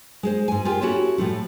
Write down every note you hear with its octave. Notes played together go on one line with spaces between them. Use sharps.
G#3 G#4 C5
G#2 G#5
F4 G4 G#4 A#4 G5 G#5
C#4 E4 F#4 G4 A4 C#5
A2 F3 A3